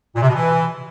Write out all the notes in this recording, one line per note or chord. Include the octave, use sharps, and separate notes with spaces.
A#2
C3
B2
E3